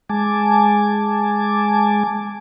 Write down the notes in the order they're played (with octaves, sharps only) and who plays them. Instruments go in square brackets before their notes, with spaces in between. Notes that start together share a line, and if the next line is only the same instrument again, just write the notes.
[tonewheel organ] G#3 G#5 A5 D6